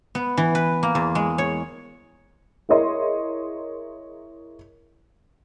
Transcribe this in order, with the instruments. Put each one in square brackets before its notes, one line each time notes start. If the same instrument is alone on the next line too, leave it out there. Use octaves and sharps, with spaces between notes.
[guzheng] B3
E3
B4
A#3
E2
G#3
C#5
[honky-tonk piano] E4 G#4 A#4 C#5 D#5 C6